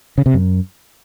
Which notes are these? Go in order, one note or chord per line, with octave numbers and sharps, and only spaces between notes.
C#3
C3
F#2